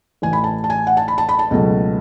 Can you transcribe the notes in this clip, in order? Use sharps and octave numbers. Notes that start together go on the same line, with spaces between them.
A1 A2 E3 G#5
B5
A5
A5
G#5
F#5
A5
B5
A5
B5
A5
C#2 B2 F#3 A3